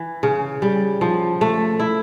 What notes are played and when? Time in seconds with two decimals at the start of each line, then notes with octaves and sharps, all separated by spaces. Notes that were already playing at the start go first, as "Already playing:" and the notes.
Already playing: E3
0.23 C#3
0.62 G3
1.01 F3
1.41 A3
1.80 E4